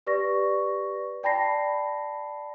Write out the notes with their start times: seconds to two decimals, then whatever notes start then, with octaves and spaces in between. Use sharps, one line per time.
0.07 G4 B4 D5 C#6 A#6
1.23 D5 G5 A5 B5 A#6 C7